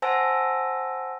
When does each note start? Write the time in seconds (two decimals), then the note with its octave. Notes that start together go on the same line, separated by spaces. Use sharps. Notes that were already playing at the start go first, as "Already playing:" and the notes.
0.02 C5 F#5 G#5 A5 E6 A#6